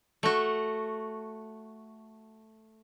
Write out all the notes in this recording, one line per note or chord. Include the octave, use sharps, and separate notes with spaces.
A3 F#4